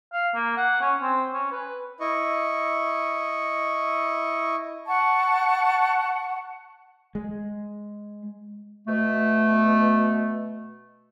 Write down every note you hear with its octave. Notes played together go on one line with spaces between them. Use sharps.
F5
A#3
F#5
C#4
C4
C#4
B4
E4 D#5 C#6
F#5 A5 C#6
G#3
B2 A3